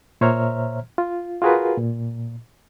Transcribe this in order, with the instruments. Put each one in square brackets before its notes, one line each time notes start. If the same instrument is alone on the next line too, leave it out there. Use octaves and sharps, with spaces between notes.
[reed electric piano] A#2 C5 C#5 E5 A#5 F6
F4
F4 F#4 G#4 A#4 B4
A#2